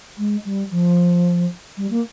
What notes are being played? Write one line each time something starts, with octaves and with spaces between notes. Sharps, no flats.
G#3
G3
F3
G3
A#3